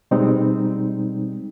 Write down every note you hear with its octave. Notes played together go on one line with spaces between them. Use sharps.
B2 G3 G#3 C4 D#4